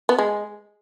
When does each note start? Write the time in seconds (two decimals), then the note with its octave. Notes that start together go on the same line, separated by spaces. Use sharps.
0.09 B3
0.18 G#3